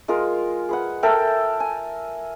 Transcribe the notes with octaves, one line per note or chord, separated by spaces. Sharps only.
G#3 F4 G#4 A#4
G#4 B4 F#5
A4 A#4 E5 G5
G#5